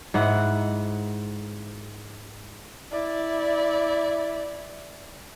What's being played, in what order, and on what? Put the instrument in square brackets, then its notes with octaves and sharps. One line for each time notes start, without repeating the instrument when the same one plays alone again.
[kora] G#2 E4 F#5
[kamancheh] E4 D5